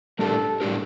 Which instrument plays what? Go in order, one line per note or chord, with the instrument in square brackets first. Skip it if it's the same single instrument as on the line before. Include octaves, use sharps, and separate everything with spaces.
[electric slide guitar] A2 G3 D4 G4 A#4 [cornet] A4
[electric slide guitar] A2 G3 D4 G4 A#4